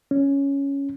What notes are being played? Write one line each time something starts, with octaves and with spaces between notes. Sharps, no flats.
C#4